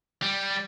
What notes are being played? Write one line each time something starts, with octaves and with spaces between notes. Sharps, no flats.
G3